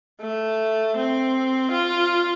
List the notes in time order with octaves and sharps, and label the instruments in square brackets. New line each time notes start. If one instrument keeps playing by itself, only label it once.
[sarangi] A3
C4
F4